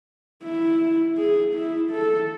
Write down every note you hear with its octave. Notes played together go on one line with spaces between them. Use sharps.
E4
G#4
E4
A4